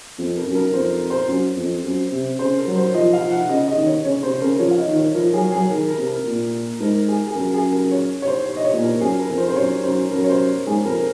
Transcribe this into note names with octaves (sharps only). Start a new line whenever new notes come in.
F2
A#4
F#2
A#4
F2 C5
C5
F#2
F2
F#2
C3
C#3 C5
A#4
F#3
C5
F3 D#5
F5
F3
F#5
C#3 D#5
D#5
D#3
C#5
C#3 C#5
C3 C5
C#3 A#4
F3 C#5
F5
D#5
D#3
C#5
F3 A#4
F#3 G#4
F#3 G#4
D#3 A#4
A#4
C3
A#4
A#2
G#2 A#4
G#4
G#4
F#2 A#4
G#4
A#4
C#5
C#5
C5
C#5
D#5
C#5
A#2
A#4
F#2 G#4
A#4
F2
C5
C5
F#2 C#5
F#2 C5
F#2 A#4
C#5
C5
G#2 G#4
F2 A#4